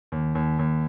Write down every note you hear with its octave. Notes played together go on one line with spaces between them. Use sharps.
D#2
D#2
D#2